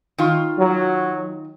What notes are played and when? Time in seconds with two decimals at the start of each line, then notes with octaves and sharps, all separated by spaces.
0.18 D#3 F4
0.57 F#3